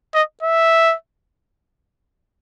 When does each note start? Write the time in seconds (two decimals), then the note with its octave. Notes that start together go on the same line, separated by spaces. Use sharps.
0.14 D#5
0.43 E5